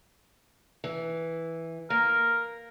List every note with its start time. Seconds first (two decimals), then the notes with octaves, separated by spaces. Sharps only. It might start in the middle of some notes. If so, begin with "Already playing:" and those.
0.84 E3
1.90 A#3 A#4